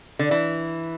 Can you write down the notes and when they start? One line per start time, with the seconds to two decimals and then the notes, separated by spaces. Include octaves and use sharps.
0.19 D3
0.31 E3